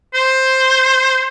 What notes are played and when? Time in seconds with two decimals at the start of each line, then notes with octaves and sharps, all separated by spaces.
0.14 C5